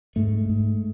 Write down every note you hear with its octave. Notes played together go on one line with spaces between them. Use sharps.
G#2 A3
G#2